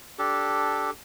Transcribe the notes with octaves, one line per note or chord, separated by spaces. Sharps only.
D4 G4 A4